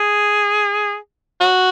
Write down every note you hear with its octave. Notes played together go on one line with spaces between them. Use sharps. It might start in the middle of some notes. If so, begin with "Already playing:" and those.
Already playing: G#4
F#4